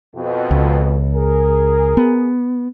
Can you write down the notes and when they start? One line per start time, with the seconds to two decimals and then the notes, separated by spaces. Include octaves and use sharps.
0.15 F2 B2
0.51 C#2
1.14 G#4 A#4
1.97 B3